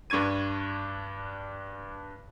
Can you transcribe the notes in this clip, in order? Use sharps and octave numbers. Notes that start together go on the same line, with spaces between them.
G2 D4 C#6 G#6 D#7